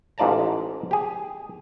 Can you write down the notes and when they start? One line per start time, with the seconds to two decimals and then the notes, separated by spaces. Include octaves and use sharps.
0.18 A1 G#2 F4 D5 A5 A#5
0.91 G4 G#4